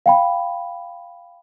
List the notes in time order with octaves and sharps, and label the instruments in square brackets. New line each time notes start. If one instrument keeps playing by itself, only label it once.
[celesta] F5 G5 B5